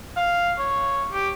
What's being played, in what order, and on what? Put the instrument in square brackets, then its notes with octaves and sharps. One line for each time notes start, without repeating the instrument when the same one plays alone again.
[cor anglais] F5
C#5
G4